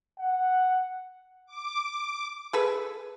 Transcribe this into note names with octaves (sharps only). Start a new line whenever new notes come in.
F#5
D6
G#4 A4 B4